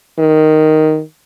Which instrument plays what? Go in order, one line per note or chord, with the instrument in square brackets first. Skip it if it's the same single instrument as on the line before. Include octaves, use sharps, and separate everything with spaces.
[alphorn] D#3